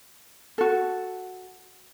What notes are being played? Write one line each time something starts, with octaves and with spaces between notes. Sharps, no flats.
F#4 A4